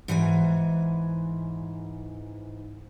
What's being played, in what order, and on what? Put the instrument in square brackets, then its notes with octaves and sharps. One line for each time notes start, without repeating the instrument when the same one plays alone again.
[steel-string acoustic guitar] G#2 E3 G#4 G#5